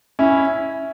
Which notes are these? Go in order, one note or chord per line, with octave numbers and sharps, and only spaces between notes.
C#4 E4